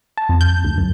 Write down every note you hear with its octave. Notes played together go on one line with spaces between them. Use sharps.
A5
F2
G6
D2
F#2